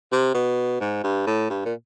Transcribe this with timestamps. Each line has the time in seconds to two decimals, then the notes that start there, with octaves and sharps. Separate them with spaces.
0.12 C3
0.34 B2
0.81 G#2
1.04 G2
1.27 A2
1.50 G2
1.65 A#2